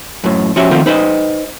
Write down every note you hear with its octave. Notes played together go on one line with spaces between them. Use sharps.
F#2 A2
F3 C#4 F#4 G4 E5
D#3 F3 A3 B3 C4 F4
D#4 B4 C5 D#5